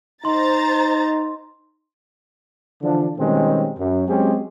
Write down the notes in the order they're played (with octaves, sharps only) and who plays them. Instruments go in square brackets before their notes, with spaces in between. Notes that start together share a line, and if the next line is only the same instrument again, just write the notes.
[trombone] D#4 [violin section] C5 A#5 A6 [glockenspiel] C6
[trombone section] D3 E3 F3 D4
B2 D#3 G3 G#3 C4 C#4
F#2
F#3 G#3 C4 C#4 G4 G#4